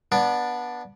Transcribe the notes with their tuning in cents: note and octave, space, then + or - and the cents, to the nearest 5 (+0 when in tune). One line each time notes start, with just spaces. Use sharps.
B3 -20 D4 +0 D5 +0